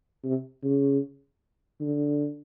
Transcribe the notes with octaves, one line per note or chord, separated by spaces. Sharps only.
C3
C#3
D3